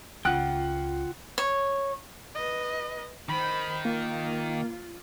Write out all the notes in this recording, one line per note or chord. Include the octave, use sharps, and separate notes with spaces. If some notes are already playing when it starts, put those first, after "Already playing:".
C#2 F4 F#5 G5 F#6
C#5
B4 D#5
D#3 C5 B5
A#3 F4